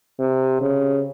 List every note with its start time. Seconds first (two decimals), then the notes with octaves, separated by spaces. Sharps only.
0.19 C3
0.61 C#3